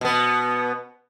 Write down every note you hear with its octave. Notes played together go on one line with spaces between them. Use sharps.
B2 B3